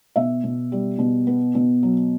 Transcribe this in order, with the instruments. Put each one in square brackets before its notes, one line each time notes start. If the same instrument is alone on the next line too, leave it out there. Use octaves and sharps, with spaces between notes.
[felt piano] B2 E5
B2
G3
B2
B3
B2
F#3